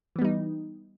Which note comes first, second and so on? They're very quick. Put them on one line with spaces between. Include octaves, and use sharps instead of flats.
E3 B3 G3 D#4